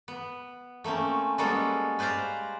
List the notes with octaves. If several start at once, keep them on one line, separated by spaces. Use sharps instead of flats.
B3
A3 A#3 C4 C#4
G3 G#3 A#3 B3 C#4 A4
B4 C5 D5 F5 A#5